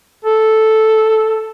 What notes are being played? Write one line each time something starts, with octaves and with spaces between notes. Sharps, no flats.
A4